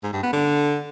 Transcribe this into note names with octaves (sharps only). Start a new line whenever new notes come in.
G#2
G2
B3
D3